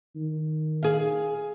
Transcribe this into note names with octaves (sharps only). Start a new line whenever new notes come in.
D#3
G#4 F5